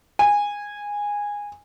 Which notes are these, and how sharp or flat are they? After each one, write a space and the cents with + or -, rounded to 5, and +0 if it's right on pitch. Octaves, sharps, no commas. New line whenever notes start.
G#5 -15